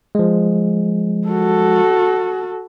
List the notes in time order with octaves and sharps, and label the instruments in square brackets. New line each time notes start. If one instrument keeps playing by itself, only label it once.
[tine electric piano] F3 G#3
[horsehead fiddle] F#4 A4